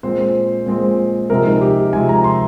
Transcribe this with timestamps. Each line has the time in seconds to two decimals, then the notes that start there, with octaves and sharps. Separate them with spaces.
0.03 A#2 G#3 C4 C5
0.66 A#2 G#3 C4
1.30 C3 F3 G#3 A#4
1.46 D#4
1.61 G4
1.93 C3 F3 G#3 G#5
2.09 A#5
2.24 C6